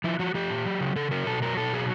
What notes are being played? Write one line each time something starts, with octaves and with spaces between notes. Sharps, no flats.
F3 E4
F3 F#4
F3 G4
A#2
F#3
C#3
C#3 A4
F#3 A#4
B2 A4
F#3 A#4
B2 A4
F#3 G#4